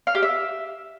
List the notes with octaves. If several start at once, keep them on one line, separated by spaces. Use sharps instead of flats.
F5
G4
E5